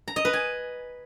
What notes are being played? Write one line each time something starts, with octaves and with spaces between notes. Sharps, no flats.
A#5
D#5
B4
G#5